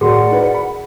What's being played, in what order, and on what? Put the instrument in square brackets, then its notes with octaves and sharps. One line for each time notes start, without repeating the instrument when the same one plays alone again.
[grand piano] A2 [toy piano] F#4 G#4 [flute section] A#4 D5 F#5
[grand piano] D#4 E4 B4
B5